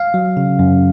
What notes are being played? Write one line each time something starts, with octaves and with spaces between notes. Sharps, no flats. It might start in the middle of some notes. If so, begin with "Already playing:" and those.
Already playing: F5
F#3
C#3
F#2